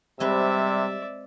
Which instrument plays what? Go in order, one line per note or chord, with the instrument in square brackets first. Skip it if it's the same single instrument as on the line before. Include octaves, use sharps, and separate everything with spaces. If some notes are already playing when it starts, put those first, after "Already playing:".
[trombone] C3 [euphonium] G3 [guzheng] G#3 C4 B4 [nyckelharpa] D5 E5